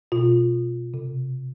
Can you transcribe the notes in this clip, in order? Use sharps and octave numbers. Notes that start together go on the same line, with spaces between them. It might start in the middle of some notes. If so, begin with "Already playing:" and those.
B2 F4
C3